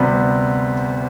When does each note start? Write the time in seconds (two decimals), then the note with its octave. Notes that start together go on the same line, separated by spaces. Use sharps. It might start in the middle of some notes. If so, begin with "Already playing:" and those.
Already playing: D2 C3 G3 B3